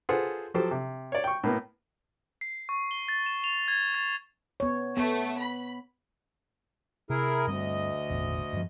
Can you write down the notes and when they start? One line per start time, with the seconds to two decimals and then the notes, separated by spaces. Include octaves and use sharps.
0.09 F4 G#4 A4 B4 C5 F#5
0.54 F3 F#3 G4 A4 C5
0.71 C3
1.12 C#5 D5
1.24 G5 C#6
1.44 A2 A#3 B3
2.41 C7
2.69 C#6
2.91 G7
3.08 A6
3.26 E7
3.44 F7
3.68 G#6
3.94 A6
4.60 B3 C#5
4.97 A3 B3
5.39 B5
7.10 C3 E4 G#4 A#4
7.47 D2 G2 G3 C4 D#5
8.09 G#1 E2 A#2
8.53 G2 F3